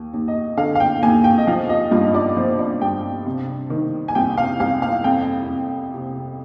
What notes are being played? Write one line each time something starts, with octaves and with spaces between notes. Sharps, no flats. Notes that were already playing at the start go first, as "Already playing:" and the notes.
Already playing: D#2
D#2
D#5
D3 F5
F5
G5
D#2 G#5
G5
D#5
F3 F5
D#5
G2 F4
D#5
D5
F3 C5
D5
G2 G5
C3
D#3
G#5
C2 G5
F5
C2 F5
F5
F2 G5
F2
C3